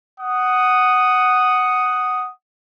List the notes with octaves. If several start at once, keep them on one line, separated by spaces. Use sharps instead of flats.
F#5 D#6